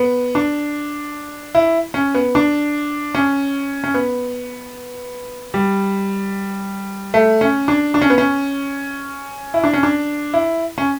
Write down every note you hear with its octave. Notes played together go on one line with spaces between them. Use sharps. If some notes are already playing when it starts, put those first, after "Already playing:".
Already playing: B3
D4
E4
C#4
B3
D4
C#4
C#4
B3
G3
A3
C#4
D4
D4
C#4
B3
C#4
E4
D4
C#4
D4
E4
C#4